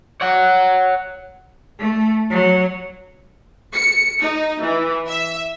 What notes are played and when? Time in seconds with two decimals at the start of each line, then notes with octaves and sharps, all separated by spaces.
0.21 C#5 F#5
1.79 A3
2.30 F#3
3.74 C#7
4.21 D#4
4.62 E3
5.08 E5